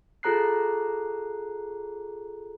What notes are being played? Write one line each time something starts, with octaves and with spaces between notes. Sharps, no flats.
F4 G#4 A4 A#5 F#6 C7